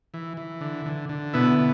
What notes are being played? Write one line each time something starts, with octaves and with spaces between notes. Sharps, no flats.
E3
E3
D3
D3
D3
B2 B3 E4
B2